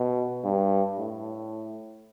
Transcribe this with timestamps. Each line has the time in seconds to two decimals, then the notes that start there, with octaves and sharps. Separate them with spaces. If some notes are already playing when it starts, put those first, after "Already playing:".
Already playing: B2
0.44 G2
0.98 A2